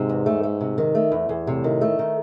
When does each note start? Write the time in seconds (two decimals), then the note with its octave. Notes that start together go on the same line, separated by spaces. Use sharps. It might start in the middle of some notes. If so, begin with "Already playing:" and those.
Already playing: G#2 C3
0.09 E2
0.26 A3
0.43 A3
0.61 C3
0.78 D#3
0.95 A3
1.12 E2
1.29 E2
1.47 A2 C3
1.64 D#3
1.81 A3
1.99 D#3